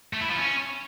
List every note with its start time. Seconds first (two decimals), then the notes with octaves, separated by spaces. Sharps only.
0.13 A3
0.21 E4
0.29 F3
0.37 C#4